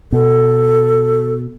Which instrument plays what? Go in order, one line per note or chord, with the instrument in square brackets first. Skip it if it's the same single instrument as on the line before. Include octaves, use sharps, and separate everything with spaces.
[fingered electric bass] B2 [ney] A4